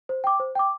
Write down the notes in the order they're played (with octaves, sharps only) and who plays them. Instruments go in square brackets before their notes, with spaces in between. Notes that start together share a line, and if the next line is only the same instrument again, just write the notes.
[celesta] C5
G5 D6
C5
G5 D6